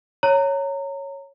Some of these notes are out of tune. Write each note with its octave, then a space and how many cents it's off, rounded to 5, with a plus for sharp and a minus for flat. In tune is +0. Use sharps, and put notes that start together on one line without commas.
C#5 +0 A#5 -25